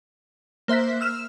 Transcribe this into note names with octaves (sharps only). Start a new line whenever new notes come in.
A#3 C5 E5 F#6 B6
E6 F6 E7